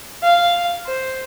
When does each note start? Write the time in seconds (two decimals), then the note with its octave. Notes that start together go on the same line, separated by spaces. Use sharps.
0.23 F5
0.86 C5